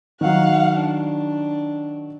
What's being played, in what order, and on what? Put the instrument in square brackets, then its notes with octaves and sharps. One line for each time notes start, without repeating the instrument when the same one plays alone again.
[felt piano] D#3 F#3 [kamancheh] F5 F#5
[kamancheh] D4